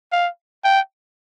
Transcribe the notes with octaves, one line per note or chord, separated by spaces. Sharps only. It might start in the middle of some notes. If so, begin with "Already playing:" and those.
F5
G5